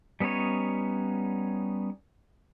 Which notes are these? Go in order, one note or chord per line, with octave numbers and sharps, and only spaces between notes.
G3 B3 C#4 D#4 C#5